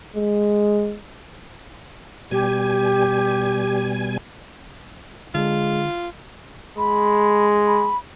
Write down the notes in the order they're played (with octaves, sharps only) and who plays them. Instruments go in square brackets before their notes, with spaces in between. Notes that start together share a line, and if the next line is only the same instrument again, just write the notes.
[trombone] G#3
[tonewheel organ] B2 G3 G#5 [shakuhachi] G4
[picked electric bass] D3 [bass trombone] G#3 [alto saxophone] F4
[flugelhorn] G#3 [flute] B5
[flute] B5